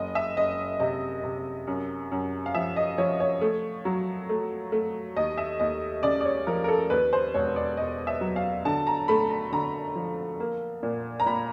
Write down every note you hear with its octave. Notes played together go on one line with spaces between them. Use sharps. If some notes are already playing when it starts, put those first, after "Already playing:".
Already playing: F#1 D#5
E5
F#1 D#5
C3 D#5
C3
F#2
F#2
F5
F3 E5
D#5
F3 C#5
C#5
A3
F#3
A3
A3
D#2 D#5
E5
D#2 D#5
C#3 D5
D5
C#5
F3 A#4
A#4
A4
D#2 B4
C5
E1 C#5
D5
E1 D#5
E5
F#3
F5
D3 A5
A#5
A3 B5
A#5
D3 A#5
F3
A#3
A#2
A#5
A#2 B5